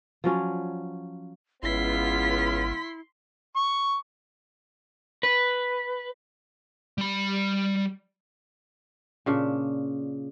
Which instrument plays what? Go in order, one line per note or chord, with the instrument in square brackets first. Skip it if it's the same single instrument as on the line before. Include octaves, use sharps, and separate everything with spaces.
[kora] F3 F#3 C#4 D5
[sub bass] G#1 [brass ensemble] C#2 B3 F4 [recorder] E4 [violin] C6 B6
[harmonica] C#6
[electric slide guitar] B4
[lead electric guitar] G3 B5
[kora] A#2 C#3 D4